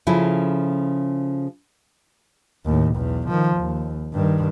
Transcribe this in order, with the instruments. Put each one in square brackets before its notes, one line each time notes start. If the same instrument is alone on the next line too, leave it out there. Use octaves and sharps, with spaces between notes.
[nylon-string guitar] C#3 F3 C#4 E4 A4
[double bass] D#2 A2
B1 E2
D#3 F3
D#2
G2 D#3